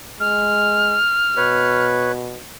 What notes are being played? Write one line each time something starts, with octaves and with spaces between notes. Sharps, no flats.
G#3 F6
B2 B4 C#5